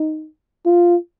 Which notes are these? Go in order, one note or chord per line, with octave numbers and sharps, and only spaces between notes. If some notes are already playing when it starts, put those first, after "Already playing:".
Already playing: D#4
F4